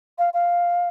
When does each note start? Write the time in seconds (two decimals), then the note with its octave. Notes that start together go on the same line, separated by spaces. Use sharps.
0.18 F5
0.34 F5